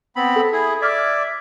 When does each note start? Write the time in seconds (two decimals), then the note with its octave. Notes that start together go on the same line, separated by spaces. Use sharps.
0.16 B3 C4 B5
0.36 A4
0.52 E4 G#4
0.81 D5 E5 D6 F6 G#6